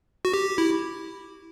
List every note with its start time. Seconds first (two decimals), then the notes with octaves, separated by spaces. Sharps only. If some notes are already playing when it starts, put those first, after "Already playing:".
0.25 F#4
0.34 G4
0.58 E4